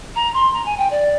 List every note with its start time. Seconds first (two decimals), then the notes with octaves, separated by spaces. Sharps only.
0.15 A#5
0.34 C6
0.53 A#5
0.65 G#5
0.77 G5
0.90 D5